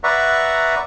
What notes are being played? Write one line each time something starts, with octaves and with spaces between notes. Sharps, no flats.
B4 D5 E5 F#5 A#5 C#6